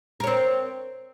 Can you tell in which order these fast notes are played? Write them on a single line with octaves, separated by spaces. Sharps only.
A#4 C#5 C4